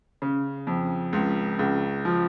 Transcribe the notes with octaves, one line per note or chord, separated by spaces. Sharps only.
C#3
F2
C#2
C#2
F3